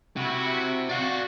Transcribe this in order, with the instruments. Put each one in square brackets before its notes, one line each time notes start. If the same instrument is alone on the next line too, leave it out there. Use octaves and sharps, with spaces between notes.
[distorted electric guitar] C3 [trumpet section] E4 F#4
[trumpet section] F#4 [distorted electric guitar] D5 F5